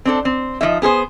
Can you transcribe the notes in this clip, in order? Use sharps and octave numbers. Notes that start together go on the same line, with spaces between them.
C4 D4 A4
C4
F3 A#3 D#4 E5
B3 G#4 A4 C5